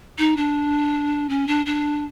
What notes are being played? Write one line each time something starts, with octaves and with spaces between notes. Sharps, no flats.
D#4
D4
C#4
D4
D4